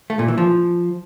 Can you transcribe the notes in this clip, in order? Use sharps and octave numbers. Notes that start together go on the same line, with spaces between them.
A3
A#2
E3
F3